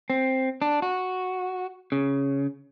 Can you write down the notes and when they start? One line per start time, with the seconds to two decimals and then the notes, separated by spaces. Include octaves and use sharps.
0.10 C4
0.62 D4
0.82 F#4
1.92 C#3